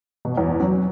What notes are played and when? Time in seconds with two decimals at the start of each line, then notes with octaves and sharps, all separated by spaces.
0.25 B2
0.37 E2
0.60 F#3